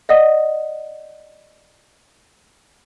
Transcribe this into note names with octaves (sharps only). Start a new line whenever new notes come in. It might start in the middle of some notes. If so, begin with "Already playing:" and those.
D5 D#5 F#5 D#6